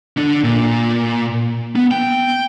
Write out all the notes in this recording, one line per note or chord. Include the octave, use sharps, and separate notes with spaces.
D3 D4
A#2
B3
G5